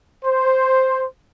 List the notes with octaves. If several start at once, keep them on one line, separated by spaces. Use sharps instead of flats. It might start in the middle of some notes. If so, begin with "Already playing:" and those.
C5